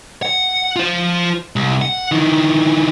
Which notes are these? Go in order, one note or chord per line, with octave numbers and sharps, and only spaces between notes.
F#5
F4 C5
C2
F#5
D#3 E3